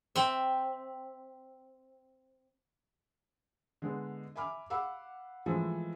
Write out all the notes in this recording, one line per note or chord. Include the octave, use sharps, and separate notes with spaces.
C4 E5
D3 G#3 B3
E5 G#5 B5 D6 F6
F5 F#5 B5 D6 E6
E3 F3 G#3 A3 C4